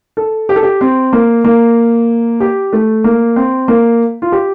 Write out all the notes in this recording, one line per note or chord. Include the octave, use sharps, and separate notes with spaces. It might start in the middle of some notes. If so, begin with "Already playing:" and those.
A4
G4
A4
G4
C4
A#3
A#3
G4
A3
A#3
C4
A#3
F4
G4